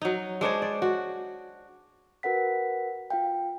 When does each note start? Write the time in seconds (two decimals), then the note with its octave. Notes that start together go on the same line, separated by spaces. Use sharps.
0.02 F#3 D#4
0.41 G#3 D4 C5 C#5
0.62 D5
0.82 F#4
2.23 F#4 A#4 B4 F#5 B6
3.10 F4 F5 G5